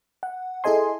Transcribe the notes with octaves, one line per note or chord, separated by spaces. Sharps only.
F#5
E4 G#4 A4 D#5 G#5 C6